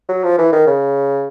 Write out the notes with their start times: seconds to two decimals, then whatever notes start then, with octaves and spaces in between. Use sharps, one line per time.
0.09 F#3
0.24 F3
0.39 E3
0.53 D#3
0.67 C#3